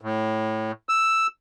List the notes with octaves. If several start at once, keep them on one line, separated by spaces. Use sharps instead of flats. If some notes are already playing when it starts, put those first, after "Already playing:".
A2
E6